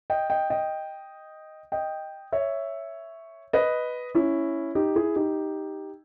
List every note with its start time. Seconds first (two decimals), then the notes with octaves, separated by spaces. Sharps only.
0.10 D#5 G5
0.30 D#5 G5
0.50 D#5 G5
1.72 D#5 G5
2.32 C#5 E5
3.53 B4 D#5
4.15 C#4 E4
4.75 D#4 G4
4.96 E4 G#4
5.16 D#4 G4